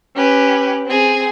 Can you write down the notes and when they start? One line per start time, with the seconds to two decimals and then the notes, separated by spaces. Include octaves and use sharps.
0.15 C#4 G4 B4
0.85 C4 G#4